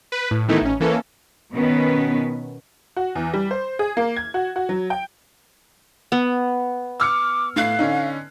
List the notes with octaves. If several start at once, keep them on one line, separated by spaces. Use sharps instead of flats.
B4
A2
D#3 E3 A3 B3 D#4 E4
A1 C#4
E3 A#3 C#4 A4
B2 D#3 B3 C#4 B4
F#4
E2
G3
C5
G#4
A#3
G#6
F#4
F#4
F#3
G5
B3
D6 E6 F6 C#7
A2 F5 F#6 C7
D3 C#4 D#4